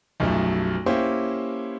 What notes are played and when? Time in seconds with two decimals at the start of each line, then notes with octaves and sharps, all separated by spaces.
0.20 B1 F#2 F3 G3 A3
0.86 A#3 C#4 E4 G4 C5